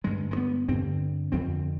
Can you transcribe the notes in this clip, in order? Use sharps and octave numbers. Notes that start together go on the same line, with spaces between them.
G2 D3 G#3
G#3
B3
G2 D3 C4
F2 D3 C4